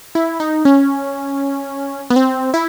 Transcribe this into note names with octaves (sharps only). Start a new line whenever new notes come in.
E4
D#4
C#4
B3
C4
E4